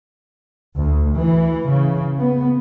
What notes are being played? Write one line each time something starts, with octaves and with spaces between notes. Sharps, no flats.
D2
E3
C#3
B3